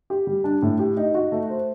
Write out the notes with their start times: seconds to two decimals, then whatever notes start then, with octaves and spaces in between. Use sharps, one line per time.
0.10 G4
0.27 G3
0.44 D4
0.62 A2
0.79 G4
0.97 D#4
1.14 F#4
1.32 A3
1.49 C5